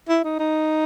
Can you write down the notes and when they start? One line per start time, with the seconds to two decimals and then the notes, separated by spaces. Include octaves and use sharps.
0.08 E4
0.24 D#4
0.39 D#4